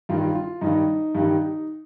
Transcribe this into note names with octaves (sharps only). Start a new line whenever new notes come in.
G2 D#3 G3 F4
F4
G2 D#3 G3 D#4
G2 D#3 G3